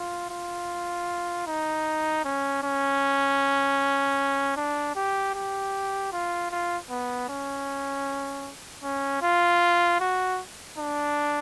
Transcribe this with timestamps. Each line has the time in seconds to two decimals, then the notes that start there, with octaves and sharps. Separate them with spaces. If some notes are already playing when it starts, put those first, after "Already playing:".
Already playing: F4
0.30 F4
1.47 D#4
2.25 C#4
2.63 C#4
4.57 D4
4.96 G4
5.35 G4
6.12 F4
6.51 F4
6.90 B3
7.29 C#4
8.84 C#4
9.22 F4
10.00 F#4
10.78 D4